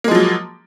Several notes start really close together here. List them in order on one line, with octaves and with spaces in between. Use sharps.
A#3 G#3 F3 F#3